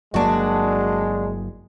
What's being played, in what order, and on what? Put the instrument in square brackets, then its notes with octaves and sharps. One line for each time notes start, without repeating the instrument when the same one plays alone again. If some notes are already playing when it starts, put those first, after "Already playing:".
[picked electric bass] G1 F#3 A#3 [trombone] G#3 [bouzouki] D4 F#4